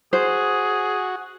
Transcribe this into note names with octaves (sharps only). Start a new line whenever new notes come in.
F#4 G#4 C5